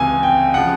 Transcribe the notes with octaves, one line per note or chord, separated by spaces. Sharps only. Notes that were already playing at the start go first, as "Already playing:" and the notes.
Already playing: C#2 C3 E3 G#5
G5
C#3 F3 F#5